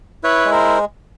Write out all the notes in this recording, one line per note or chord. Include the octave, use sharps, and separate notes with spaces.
E4 B4 C#5
G#3
A#4 C5